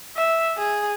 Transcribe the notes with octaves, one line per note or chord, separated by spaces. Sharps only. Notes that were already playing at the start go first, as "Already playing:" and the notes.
E5
G#4